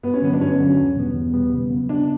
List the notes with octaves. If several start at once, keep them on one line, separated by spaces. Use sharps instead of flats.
G2 B3
C#4
D3 F#3 B3
D4
G2 C#4
D3 F#3
E2
B2 G3 B3
E2
B2 G3 B3
C#3
F#3 B3
C#3 D4